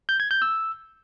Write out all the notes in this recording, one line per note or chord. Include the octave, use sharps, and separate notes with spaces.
G6
G#6
G6
E6